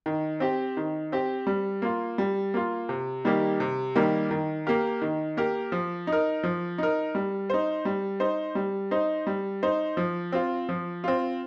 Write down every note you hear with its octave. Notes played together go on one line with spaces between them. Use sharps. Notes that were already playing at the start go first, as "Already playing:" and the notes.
D#3
C4 G4
D#3
C4 G4
G3
A#3 F4
G3
A#3 F4
C3
D#3 G3 A#3 G4
C3
D#3 G3 A#3 G4
D#3
A#3 G4 A#4
D#3
A#3 G4 A#4
F3
D#4
A#4
F3
D#4 A#4
G3
D#4 C5
G3
D#4 C5
G3
D#4 C5
G3
D#4 C5
F3
C4 F4
F3
C4 F4